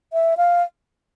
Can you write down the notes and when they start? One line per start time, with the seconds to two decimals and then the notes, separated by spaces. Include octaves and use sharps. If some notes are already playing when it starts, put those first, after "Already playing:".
0.13 E5
0.37 F5